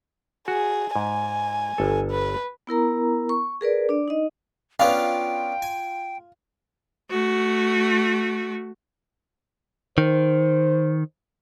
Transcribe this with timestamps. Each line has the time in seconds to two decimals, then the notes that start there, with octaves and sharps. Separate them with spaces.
0.48 F#4 G#4
0.96 G#2 G#5
1.78 G1 A4
2.11 B4
2.67 B3 E4 A#4 A#5
3.29 C#6
3.61 G#4 A#4 B4 D5
3.89 D4 D5
4.08 D#4 D#5
4.79 B3 C#4 D4 F4 F5 G5
5.62 G#5
7.10 A3 F#4
9.98 D#3 C5